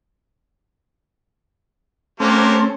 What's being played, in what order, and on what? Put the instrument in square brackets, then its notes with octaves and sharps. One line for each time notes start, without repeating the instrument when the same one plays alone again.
[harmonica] F#3 A#3 G4 [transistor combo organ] A3 C4 [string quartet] C#4